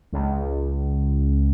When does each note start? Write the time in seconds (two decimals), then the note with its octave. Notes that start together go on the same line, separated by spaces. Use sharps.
0.13 C#2